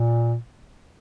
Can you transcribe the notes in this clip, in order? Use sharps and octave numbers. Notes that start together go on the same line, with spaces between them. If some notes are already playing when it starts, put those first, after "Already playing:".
Already playing: A#2